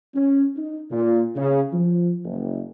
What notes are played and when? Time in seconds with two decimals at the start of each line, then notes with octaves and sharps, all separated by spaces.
0.15 C#4
0.56 D#4
0.91 A#2
1.36 C#3
1.73 F3
2.25 F#1